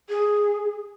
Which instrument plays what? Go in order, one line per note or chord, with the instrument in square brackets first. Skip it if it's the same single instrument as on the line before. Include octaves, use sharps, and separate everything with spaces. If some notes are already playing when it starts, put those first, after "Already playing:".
[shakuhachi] G#4